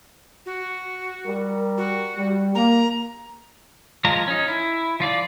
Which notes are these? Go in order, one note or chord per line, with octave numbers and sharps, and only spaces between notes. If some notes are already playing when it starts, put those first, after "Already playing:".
F#4
G3 A#4
F#4
G3
A#3 A#5
F3 G#3 F4 A#5
C#4 D#4
E4
F3 F4 D5